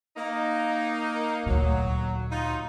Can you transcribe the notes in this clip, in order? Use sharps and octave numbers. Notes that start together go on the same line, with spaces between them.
A#3 D#4
D2 A#2 F#3
D#4 F4